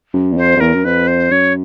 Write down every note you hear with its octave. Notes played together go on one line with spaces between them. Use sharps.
F#2
E2
F2 C5
F2
E2 A#4
F#2
F2 B4
C5
F#2 C#5